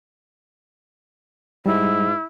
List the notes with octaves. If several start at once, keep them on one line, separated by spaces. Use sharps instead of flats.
G#2 G3 E4